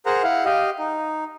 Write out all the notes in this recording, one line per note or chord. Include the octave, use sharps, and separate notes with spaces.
G#4 A#4 C5 F#5 A#5
E4 F5 F#5
G4 D#5 F5
D#4